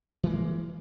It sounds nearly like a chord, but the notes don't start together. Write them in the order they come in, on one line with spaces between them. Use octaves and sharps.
E3 G#3 A#3